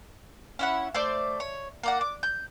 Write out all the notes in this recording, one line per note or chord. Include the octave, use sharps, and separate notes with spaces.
C#4 E4 F#5
A3 C5 D5 D6
C#5
A#3 D5 F#5
D6
G6